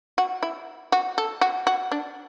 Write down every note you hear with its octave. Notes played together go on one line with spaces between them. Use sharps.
F#4
E4
F#4
A4
F#4
F#4
D4